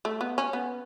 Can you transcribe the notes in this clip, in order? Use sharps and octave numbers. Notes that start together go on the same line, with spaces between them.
A3
B3
C#4
B3